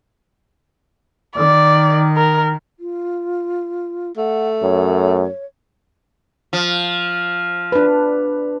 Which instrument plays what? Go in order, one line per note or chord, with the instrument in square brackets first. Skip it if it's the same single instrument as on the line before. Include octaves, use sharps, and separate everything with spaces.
[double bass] D#3 [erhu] D5
[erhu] A#4
[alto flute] F4
[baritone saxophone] A3 [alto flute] F#5
[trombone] F#2 [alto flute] C#5
[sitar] F3
[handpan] D4 B4